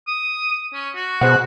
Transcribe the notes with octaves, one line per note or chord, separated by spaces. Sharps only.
D#6
C#4
F#4
B2 G#4 C5 F#5 F#6